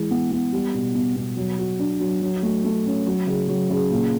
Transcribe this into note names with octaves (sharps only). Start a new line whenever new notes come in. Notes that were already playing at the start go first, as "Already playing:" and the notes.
Already playing: E3 G#3
B3
B3
G3
B2
B2
B2
F#3
F#4
D4
F#3
F#3
A3
A3
C#4
F#3
C#3
F#3
C#3
A#2